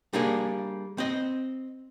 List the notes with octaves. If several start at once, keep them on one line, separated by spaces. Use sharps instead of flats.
G3 A#3 D4 G#4
C4 D#5